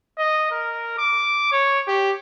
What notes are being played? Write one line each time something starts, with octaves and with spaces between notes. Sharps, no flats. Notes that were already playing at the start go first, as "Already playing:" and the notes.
D#5
A#4
D6
C#5
G4